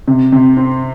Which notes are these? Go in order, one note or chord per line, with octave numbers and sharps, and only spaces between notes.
C3
C3
C4